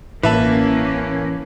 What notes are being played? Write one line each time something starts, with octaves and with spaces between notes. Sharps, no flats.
A1 E3 A#3 C#4 B4 E5 A5